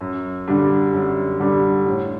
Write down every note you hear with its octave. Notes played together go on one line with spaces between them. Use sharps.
F#2
D3 G3 D4
F#2
D3 G3 D4
A2